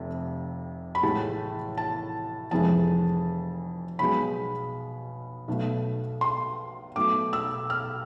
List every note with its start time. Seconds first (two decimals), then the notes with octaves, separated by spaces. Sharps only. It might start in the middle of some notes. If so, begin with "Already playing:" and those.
Already playing: F1 F2 C3
0.95 B5
1.03 A1 A2 E3 G#3 A5
1.77 A5
2.51 F1 F2 E3 G#3 A5
3.99 B1 B2 G#3 B5
5.48 B1 B2 A3
6.21 C6
6.96 B1 B2 A3 D6
7.33 E6
7.70 F6